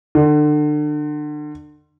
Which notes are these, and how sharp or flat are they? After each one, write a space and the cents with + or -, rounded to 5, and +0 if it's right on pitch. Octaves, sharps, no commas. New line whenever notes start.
D3 +35